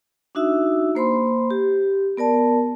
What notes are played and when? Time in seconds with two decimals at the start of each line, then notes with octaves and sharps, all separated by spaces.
0.35 D4 D#4 F#4 E5 E6
0.95 A#3 C5 B5 C6
1.50 G4
2.17 B3 A#4 D5 A5